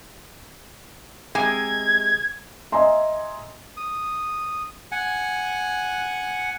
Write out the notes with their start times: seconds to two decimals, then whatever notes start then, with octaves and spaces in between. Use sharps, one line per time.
1.35 C3 G#3 G#5 G#6
2.72 D#5 E5 G#5 A#5 C6
3.77 D#6
4.92 F#5 G#5